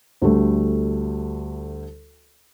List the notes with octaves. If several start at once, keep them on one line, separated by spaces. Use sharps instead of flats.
D2 G3 A3